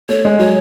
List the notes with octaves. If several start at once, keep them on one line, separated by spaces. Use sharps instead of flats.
A3 C#5
G#3
F#3 C#5